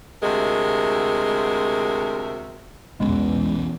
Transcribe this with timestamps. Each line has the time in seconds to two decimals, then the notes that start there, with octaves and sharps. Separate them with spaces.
0.23 D2 C3 G#3 F#4 A#4 E5
3.00 B1 E2 B2 E3 G#3 B3 C#4